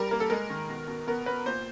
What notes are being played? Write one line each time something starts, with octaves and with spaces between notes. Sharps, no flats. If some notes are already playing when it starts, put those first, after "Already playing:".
Already playing: G3 A#4
A#3 A#4
A4
G#3 A#4
D#3
B2
B2
B3 A#4
B3 B4
A#2 C5